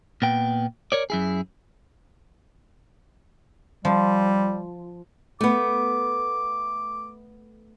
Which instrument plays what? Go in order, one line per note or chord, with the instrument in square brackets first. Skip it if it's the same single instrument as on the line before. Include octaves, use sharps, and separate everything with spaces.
[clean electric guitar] A#2 B3 G5
A#4 C#5 D5
F#2 E4 G#4
[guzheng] F3 [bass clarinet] G3
[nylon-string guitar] A3 B3 [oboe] D6